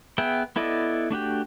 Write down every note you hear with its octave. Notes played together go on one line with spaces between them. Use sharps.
B3 G#4 E5 G5
B3 E4 A4 D5 D#5
A3 D4 F#4 G4